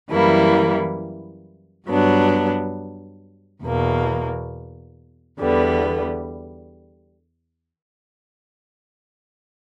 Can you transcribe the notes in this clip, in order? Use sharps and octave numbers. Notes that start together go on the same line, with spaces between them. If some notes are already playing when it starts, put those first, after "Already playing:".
F#2 E3 G3 A#3 E4
G2 F#3 B3 D4
E2 B2 A#3
E2 D3 G3 B3